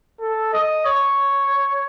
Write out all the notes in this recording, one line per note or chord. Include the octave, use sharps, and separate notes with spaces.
A4
D#5
C#5